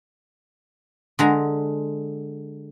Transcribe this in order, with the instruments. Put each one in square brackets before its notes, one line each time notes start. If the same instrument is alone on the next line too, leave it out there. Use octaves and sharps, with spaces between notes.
[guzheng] D3 G#3 A#5